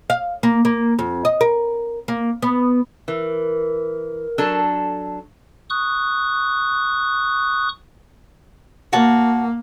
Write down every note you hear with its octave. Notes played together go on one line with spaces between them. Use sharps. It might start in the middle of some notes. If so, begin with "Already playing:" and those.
F5
A#3
A#3
F2
D#5
A#4
A#3
B3
E3 A#4
F#3 D4 A4
C#6 D#6 F#6
A#3 F#4 A5